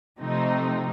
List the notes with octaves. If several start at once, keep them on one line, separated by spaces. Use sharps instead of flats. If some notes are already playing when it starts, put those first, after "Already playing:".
C3 F3 A3 C4 D#4